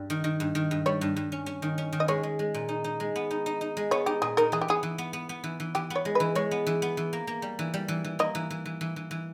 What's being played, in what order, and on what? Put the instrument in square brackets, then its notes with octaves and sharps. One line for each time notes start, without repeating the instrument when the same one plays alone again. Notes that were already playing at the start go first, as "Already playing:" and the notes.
Already playing: [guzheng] G2 G3
D#3
D#3
G2
D#3
G2
[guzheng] G3 [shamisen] C#5
[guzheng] G2
G2
C#4
C#4
D#3
C#4
D#3
[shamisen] D#5
[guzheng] G#3 [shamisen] C#5
[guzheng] G#3
G#3
A#2
D#4
D#4
G#3
B3
D#4
D#4
D#4
G#3
[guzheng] B3 [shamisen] C#5
[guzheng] D#4 [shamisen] G4
[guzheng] A#2 [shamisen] G#4
[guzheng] D#4 [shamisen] A#4
[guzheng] E3 [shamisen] G#4
[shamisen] G4
[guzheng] B3 [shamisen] G#4
[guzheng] E3
B3
B3
B3
E3
E3
[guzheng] E3 [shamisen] G4
[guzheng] B3
[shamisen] C#5
[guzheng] G#3
[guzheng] E3 [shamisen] B4
[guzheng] G#3 [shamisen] C#5
[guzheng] B3
E3
B3
E3
A#3
A#3
G3
E3
G3
E3
E3
[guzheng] A#3 [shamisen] D#5
[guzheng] E3
E3
E3
E3
E3
E3